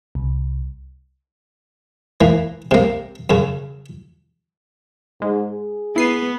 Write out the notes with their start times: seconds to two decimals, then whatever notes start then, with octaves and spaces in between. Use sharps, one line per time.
0.15 C2
2.21 E3 A#3
2.71 C3 A#3
3.30 F#2 C#3
5.22 G#2 G#3
5.52 G#4
5.96 B3 E4 C7 D#7